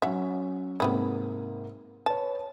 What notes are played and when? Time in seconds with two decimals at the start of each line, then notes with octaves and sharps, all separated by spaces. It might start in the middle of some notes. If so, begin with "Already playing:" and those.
0.02 F#3 C#4 E5 F#5
0.80 G#2 C3 G3 A#3 B3 E4
2.06 B4 C#5 A5